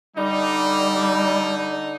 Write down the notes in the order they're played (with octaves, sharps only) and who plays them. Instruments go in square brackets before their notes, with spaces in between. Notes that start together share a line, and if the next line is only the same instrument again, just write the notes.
[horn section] D3 D#4 [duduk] G3